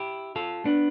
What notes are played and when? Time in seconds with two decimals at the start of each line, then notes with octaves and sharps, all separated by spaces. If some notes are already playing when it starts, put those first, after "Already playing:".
Already playing: E4 G4
0.36 F4 A4
0.65 B3 D4